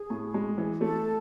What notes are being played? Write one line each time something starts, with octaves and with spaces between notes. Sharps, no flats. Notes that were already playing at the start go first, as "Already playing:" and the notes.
Already playing: G#4
A2
G#3
E3
A3 A4